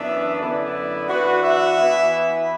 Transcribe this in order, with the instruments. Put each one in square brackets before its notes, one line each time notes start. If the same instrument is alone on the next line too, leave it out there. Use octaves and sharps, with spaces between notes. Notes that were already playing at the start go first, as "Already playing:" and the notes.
Already playing: [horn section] F#2 E3 B3 D4 [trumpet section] E5
[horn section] F#2 D3 B3 E4 [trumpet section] D5
[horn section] E3 D4 F#4 [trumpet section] B4
[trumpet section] E5
[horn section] E3 B3 E4